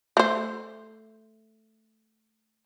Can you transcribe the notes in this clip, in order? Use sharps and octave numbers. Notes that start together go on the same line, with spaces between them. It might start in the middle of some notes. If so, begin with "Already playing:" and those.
A3 C5